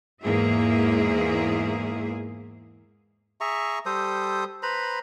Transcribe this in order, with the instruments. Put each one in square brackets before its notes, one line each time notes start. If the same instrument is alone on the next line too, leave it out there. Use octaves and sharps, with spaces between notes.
[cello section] E2 G#2 A#3 G#4 E5
[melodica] G#4 E5 A#5 C#6
G3 A4 C5 D#6
B4 C5 A#5 B5